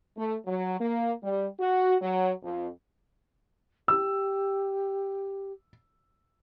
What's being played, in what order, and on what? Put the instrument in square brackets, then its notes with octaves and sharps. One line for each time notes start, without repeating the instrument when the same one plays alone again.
[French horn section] A3
F#3
A#3
G3
F#4
F#3
F2
[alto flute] G4 [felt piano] E6